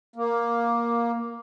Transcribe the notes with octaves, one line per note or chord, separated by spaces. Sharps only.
A#3